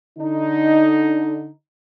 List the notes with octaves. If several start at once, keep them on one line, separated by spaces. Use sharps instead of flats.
D3 D#4